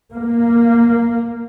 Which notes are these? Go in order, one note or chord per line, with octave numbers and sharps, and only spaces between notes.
A#3